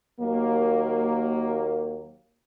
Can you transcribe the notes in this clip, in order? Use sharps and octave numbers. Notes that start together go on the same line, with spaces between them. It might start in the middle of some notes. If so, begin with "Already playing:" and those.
D#2 F#3 A#3